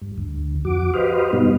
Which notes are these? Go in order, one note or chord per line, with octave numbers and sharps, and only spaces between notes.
G2
D2
F2 F#4 D6
F#4 G4 B4 C5 D#5 F5
G2 B2 G3 B3 D#4